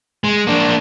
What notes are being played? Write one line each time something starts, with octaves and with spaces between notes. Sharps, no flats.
G#3
A#3 D4